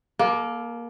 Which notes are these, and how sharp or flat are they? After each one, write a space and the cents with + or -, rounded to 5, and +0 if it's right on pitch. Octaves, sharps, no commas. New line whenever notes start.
A#3 +15 A4 -30